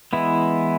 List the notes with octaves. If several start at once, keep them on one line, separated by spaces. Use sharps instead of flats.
E3 G#3 B3 E4